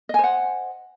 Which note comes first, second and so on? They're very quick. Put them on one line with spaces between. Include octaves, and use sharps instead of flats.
D#5 G#5 C5 F#5